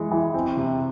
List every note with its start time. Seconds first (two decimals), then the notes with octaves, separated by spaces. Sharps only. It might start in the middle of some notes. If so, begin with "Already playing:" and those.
Already playing: E3 G#3
0.11 E3
0.34 C4
0.57 C3